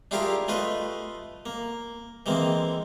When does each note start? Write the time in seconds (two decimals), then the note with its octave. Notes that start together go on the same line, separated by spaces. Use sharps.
0.11 D4 E4 F4 G4 G#4 A#4
0.48 A3 F4 B4 D#5
1.46 A#3
2.26 E3 G#3 A#3 C4